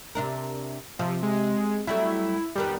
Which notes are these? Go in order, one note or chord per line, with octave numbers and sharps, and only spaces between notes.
C3 D4 A#4
C3 F3
G#3
F#3 G3 A3 E4
F2 D#3 G3 B3